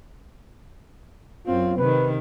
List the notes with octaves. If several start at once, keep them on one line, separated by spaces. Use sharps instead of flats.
F#2 C4 F4
C3 D#3 B4